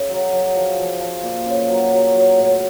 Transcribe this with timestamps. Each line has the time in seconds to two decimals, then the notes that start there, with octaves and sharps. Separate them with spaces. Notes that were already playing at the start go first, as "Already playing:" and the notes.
Already playing: C#3 E5
0.10 F#3
0.32 F#3
0.55 F3
0.78 F3
1.00 F3
1.23 A#2
1.46 C#3
1.69 F#3
1.92 F#3
2.15 F#3
2.38 A2